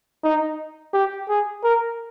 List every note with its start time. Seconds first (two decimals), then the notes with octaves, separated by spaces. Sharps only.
0.24 D#4
0.94 G4
1.29 G#4
1.64 A#4